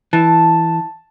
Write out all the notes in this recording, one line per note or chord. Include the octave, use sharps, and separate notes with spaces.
E3 A5